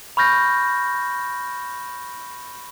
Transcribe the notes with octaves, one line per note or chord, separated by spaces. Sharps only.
B5 C#6 F6 G6 A#6